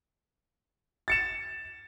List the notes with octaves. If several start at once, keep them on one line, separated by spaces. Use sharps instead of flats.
A6 C#7 E7